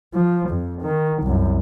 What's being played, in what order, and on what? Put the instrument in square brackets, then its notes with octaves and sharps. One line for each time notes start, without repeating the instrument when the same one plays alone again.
[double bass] F3
F2
D#3
C2 F#2